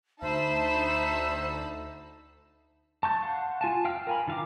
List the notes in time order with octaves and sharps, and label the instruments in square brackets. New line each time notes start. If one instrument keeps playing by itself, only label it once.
[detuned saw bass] D2 [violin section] D#4 A5 B5 [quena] C5 [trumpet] E5
[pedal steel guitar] A5 C#6 G6
F5 F#5 C6
F4 G#5 A5
F5 G5 F6
A#4 G#5 B5
D#3 F4 F5 A#5 D6